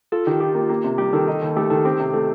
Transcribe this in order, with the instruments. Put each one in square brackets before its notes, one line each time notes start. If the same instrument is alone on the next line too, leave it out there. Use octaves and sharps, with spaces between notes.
[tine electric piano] F4 [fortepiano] A4
[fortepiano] D#3 [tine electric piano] G4
[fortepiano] F4 [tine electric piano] G4
[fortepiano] A#3
A#3
C3
[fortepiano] G3 [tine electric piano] G4
[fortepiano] D#3 [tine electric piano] A4
[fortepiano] D#4
D#2
[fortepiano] A3 [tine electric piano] G4
[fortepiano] D#3 [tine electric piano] A4
[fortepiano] C4 [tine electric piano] G4
[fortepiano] C3
[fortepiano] A3 [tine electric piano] A4